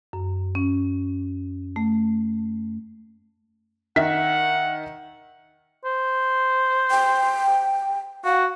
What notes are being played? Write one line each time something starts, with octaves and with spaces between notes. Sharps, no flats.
F#2
C#4
A3
D#3 E5 F#5 B6
C5
G5
F#4 F5